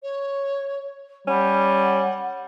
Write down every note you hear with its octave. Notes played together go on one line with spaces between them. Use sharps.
C#5
G3 C#4 F#5